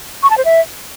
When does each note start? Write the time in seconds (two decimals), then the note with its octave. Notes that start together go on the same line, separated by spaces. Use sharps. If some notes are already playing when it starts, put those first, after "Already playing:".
0.23 C#6
0.30 A5
0.38 C5
0.45 E5